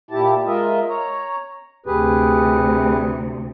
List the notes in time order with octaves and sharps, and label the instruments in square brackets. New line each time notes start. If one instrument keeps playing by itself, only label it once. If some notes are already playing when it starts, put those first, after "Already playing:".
[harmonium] A#2 E4 G4 A5
G#3 F4 A#4 D#5 E5
C#5 A#5
[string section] D2 C3 [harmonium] G4 G#4 B4